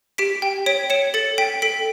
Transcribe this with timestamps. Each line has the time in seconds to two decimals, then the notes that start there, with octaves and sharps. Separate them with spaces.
0.18 G4 B6 D7
0.42 G5
0.66 C#5 B6 D7
0.90 C#5 C#7 E7
1.14 A4 A6 C#7
1.38 G5 B6 D7
1.62 A4 B6 D7